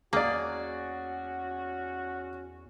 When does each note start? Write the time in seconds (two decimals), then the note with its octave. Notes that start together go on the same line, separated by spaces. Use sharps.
0.13 E2 A#3 C#4 F#4 G#4 D5